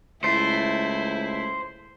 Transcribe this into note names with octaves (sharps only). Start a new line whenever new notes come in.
C#2 A3 E4 C5